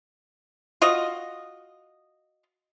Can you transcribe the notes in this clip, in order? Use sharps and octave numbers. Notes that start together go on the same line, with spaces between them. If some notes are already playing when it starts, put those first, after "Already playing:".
F4 F#4 D#5